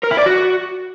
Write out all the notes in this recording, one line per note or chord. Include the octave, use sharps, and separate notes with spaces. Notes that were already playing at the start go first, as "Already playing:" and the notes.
A#4
E4
D5
F#4